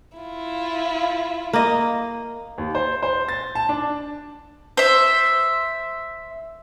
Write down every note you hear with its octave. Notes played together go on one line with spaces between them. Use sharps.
E4 F4
A#3 D#5
D#2
C5
C5
A6
A5
D4
C5 E5